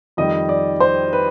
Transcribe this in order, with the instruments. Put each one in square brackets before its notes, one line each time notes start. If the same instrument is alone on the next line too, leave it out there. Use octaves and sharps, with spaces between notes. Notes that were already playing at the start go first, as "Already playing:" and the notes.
[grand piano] F2 D#3 G3 D#5
D5
C5
B4